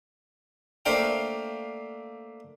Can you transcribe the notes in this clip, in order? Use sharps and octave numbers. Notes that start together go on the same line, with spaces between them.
A3 A#3 D4 C5 F5 G5